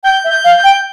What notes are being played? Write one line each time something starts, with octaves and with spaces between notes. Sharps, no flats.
G5 G6
E5
G6
F5
G6
G5